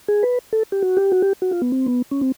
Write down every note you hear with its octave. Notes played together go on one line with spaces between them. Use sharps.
G#4
B4
A4
G4
F#4
G4
F#4
G4
F#4
F4
B3
C4
B3
C#4
C4